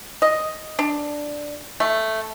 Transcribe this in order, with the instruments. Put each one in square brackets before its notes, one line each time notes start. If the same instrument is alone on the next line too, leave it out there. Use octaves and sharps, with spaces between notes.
[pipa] D#5
D4
A3